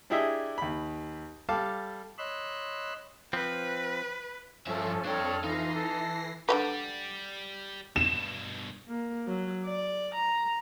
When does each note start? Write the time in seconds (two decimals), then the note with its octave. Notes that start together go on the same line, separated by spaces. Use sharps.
0.10 D4 E4 G4 G#4 D#5 E5
0.58 D#2 B5
1.49 G3 A4 F5 A5 D6
2.18 C#5 D#5 B5 C6 E6 F#6
3.33 F3 C4 B4
4.67 G2 F3 C#4 A4 E5
5.05 F2 D4 A4 C#5 G5 F6
5.44 E3 D#4 F4 A#6 C7
5.75 A4
6.49 D3 G#3 G4 B4 D5
7.96 G2 B2 E7
8.88 A#3
9.27 F#3
9.65 D5
10.15 A#5